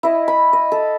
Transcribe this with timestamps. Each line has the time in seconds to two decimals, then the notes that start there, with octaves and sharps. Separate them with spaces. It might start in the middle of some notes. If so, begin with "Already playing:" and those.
0.03 E4 D#5
0.28 B5
0.53 D#5
0.72 A4